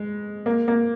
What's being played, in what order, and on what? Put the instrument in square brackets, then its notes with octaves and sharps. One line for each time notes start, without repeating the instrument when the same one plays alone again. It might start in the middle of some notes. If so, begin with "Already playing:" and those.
Already playing: [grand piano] G#3
A#3
A#3